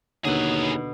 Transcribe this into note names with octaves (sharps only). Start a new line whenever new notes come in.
D#2 B2 D3 F#3 G#4 B4